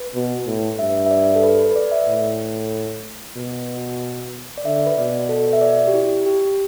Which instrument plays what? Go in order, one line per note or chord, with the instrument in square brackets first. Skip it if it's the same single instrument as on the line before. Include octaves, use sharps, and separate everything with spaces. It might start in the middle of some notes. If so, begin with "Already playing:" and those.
Already playing: [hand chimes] B4
[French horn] B2
A2
[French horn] G2 [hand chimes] E5
[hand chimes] E5
D5
A4
B4
B4
B4
D5
E5
[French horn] A2
B2
[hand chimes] D5
[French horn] D3 [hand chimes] E5
[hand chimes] B4
[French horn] B2 [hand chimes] D5
[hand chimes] A4
E5
D5
G4
E4
G4